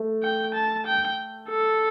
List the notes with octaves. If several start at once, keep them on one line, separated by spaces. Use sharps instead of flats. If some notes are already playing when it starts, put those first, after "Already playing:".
Already playing: A3
G5
A5
G5
A4